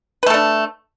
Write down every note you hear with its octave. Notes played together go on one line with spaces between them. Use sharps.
A3 D4 A4 B4